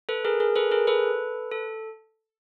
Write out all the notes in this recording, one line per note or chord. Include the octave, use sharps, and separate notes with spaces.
A4 B4
G#4 A#4
G#4 A#4
A4 B4
G#4 A#4
A4 B4
A4